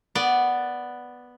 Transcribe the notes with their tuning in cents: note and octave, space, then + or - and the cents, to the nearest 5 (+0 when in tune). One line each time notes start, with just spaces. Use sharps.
B3 +0 D5 +0